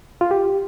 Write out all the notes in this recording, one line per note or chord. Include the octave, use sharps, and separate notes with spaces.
F4
G4